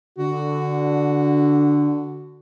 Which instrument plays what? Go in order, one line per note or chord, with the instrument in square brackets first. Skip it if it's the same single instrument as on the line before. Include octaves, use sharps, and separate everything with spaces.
[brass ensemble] D3 [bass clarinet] F#4